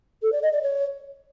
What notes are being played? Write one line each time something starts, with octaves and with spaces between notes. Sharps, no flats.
A4
D5
D#5
D5
C#5